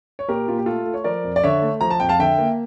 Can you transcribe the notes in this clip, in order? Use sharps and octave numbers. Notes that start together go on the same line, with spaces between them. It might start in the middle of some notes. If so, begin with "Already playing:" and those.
C#5
A#2 G4 A#4
A#2 F4
G4
A3 F4 A4
A3
C#5
F3 A#4 D5
F2
D5
D3 C#5 E5
A3
F3 A#5
A5
F2 G5
F5 A5
D3 E5 G5
A#3